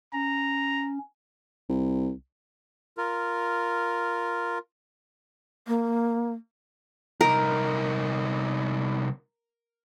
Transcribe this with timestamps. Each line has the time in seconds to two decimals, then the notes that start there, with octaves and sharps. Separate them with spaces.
0.13 C#4 A#5
1.69 C2
2.97 F4 A#4
5.67 A#3
7.21 C2 D#4 A#4